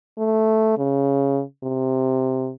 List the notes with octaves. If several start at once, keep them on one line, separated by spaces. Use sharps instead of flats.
A3
C#3
C3